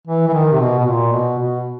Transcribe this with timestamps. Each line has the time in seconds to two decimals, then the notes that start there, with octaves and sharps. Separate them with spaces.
0.07 E3
0.28 E3
0.34 D#3
0.52 C3
0.60 B2
0.79 B2
0.86 A#2
1.12 B2
1.38 B2